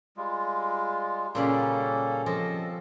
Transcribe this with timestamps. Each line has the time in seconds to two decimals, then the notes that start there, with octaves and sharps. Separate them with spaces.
0.17 G3 G#3 F4
1.35 A#2 C#3 G3 A#3 C#4 A4
2.26 F3 C4 A4 D#5